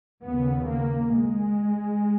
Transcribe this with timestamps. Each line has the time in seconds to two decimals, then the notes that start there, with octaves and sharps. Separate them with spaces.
0.24 D#2 C#3 B3
0.69 A#3
1.16 G#3